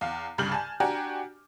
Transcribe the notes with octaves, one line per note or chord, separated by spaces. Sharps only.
E2 F5
C2 G2 C#3 F6 G6 F#7
G#5 A5
D4 F#4 G4 G#5 A#5